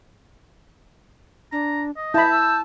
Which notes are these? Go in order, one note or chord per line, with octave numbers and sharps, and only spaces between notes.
D4 A#5
D#5
E4 A5 B5 G6
E6